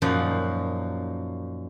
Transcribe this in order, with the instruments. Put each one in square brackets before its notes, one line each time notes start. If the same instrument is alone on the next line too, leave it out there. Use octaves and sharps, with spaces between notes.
[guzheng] F#2 A#2 F3 D#4 F#5